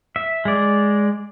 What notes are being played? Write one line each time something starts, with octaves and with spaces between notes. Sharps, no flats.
E5
G#3 D5